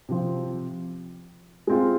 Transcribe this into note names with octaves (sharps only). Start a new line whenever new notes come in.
C3 F3 C4
G#3 C4 F4